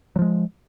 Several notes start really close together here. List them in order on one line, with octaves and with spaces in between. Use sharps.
F#3 F3 G#3